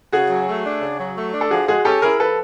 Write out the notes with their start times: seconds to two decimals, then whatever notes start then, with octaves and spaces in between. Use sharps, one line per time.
0.12 C#3 F#4 G#4
0.30 F#3
0.48 A3
0.65 D4
0.81 C#3
0.99 F#3
1.16 A3
1.34 D4
1.41 A4
1.51 F3 F#4 G#4
1.68 G#3 F#4 G#4
1.85 C#4 G4 A4
2.02 E4 G#4 A#4
2.19 F3 A4 B4